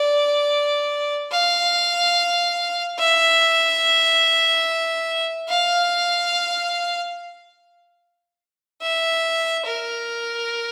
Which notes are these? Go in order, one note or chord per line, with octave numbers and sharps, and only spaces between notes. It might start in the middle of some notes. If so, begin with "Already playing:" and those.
Already playing: D5
F5
E5
F5
E5
A#4